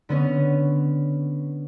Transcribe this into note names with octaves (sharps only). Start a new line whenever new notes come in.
D3 B3 C#4